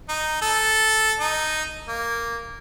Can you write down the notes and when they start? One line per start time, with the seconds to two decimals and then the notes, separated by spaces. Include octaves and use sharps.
0.09 D#4
0.42 A4
1.19 D#4
1.88 A#3